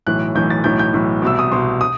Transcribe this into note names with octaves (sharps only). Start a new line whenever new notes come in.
B1 A2 E3 F#6
B1 A2 E3 G6
A6
B1 A2 E3 G6
G6
B1 A2 E3
C2 B2 E6
D#6
C2 B2 C6
D#6